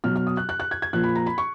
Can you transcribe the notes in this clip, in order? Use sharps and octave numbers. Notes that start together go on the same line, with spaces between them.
B2 F#3 F6
F6
D#6
F#6
F#6
F#6
G#6
G#6
A#2 F3 F#6
B5
A#5
B5
C#6